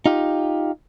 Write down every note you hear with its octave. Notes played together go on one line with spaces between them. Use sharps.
D#4 F4 G4